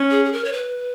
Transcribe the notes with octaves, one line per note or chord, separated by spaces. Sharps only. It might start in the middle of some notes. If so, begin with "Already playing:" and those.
Already playing: C#4
G#4
G#4
A#4
C#5
B4